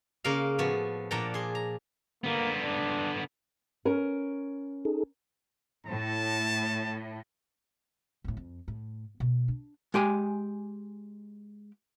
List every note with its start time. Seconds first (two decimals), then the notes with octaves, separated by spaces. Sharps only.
0.24 C#3 A#3 A#4 F5
0.59 A2 F3 B3 F#4
1.11 A#2 F3 D4 F#5 G5 A#5
1.34 G#4 C6
1.55 A#5
2.24 D3 A#3 B3
2.63 D4
3.85 C#4 A#4
4.85 D#4 G#4 A4
5.87 A2 A5
8.24 D1 A2
8.37 F2
8.68 A2
9.20 B2
9.48 D4
9.94 G#3 G4 G#5